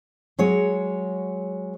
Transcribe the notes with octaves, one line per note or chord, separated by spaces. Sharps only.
F#3 G#3 C#5